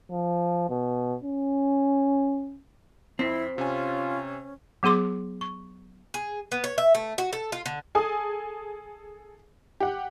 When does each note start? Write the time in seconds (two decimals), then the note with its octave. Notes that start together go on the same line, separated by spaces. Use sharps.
0.11 F3
0.70 B2
1.23 C#4
3.19 F2 C4 E4 B6
3.58 C3 C#4 F4 G#5
4.83 F#3 B3 G#4 C6 D6
5.41 C#6
6.14 G#4
6.52 B3
6.64 C#5
6.78 E5
6.95 A3
7.18 F#4
7.33 A4
7.52 F4
7.66 D3
7.95 G#4 A4 G#5 D#6
9.80 G4 F#5